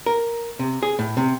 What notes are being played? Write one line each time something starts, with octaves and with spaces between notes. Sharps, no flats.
A#4
C3
G#4
A2
C3